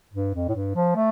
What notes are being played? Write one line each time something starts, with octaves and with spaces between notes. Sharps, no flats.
G2
F2
A2
G2
F3
A3